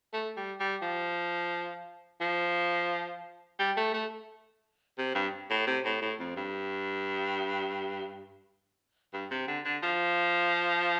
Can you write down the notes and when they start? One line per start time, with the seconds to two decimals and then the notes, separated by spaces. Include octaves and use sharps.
0.13 A3
0.37 G3
0.60 G3
0.82 F3
2.21 F3
3.59 G3
3.77 A3
3.94 A3
4.98 C3
5.15 G2
5.50 A2
5.67 C3
5.85 A2
6.02 A2
6.20 F2
6.36 G2
9.13 G2
9.31 C3
9.48 D3
9.65 D3
9.83 F3